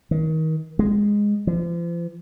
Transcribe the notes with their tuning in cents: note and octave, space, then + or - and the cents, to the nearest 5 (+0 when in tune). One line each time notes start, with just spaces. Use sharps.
D#3 +30
G#3 -10
F3 -40